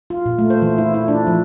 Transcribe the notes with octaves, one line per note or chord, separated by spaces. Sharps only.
F4
A#2
A3
C5
E3
E4
E4
D4
F3